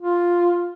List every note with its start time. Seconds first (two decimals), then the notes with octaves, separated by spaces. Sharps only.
0.01 F4